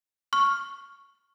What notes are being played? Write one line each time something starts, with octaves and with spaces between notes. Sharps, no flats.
C#6 F6